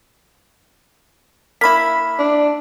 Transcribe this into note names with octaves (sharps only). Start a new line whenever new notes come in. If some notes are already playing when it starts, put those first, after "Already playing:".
A#3 E4 B5 B6
D4